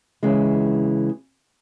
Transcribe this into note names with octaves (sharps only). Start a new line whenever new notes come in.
C#3 E3 G#3